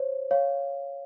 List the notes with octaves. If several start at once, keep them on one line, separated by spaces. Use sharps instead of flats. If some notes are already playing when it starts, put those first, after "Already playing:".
Already playing: C5 C#5
C#5 F5